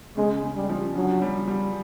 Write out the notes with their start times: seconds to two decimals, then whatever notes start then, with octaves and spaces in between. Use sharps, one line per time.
0.17 C#3 G#3
0.43 C#3
0.56 G3
0.69 F3
0.95 D3 F#3
1.22 G3
1.48 G3